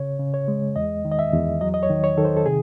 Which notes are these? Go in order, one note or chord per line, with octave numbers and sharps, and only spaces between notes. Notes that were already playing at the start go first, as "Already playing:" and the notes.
Already playing: C#3 C#5
C#3
C#5
G#3
E2 D#5
D#3
D#5
E5
E2
F#3 D#5
D#5
C#5
D#3
C#5
D#3 A4
C5
A4
C3 G#4